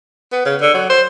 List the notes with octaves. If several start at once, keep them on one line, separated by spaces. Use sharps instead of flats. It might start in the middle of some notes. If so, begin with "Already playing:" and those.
B3
C#3
D3
F#3
C5